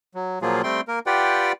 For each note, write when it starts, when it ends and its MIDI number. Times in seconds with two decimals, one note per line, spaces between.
0.15 0.39 54
0.42 0.62 46
0.42 0.62 53
0.42 0.62 54
0.42 0.62 58
0.42 0.62 65
0.42 0.62 68
0.64 0.81 55
0.64 0.81 57
0.64 0.81 60
0.64 0.81 79
0.64 0.81 84
0.88 0.99 58
0.88 0.99 70
1.06 1.52 65
1.06 1.52 67
1.06 1.52 71
1.06 1.52 74
1.06 1.52 78
1.06 1.52 79